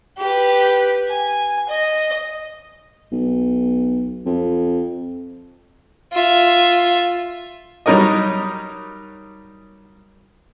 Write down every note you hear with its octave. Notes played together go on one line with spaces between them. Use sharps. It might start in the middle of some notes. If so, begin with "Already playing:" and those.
G4 B4
G#5
D#5
B1
F2
F4 E5
F#3 G3 D#4 A#4 C#5 D#5